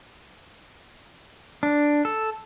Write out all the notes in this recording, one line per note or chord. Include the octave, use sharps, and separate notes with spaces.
D4
A4